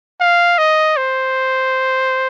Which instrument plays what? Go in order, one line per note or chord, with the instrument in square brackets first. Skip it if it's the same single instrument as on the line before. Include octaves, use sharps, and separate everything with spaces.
[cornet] F5
D#5
C5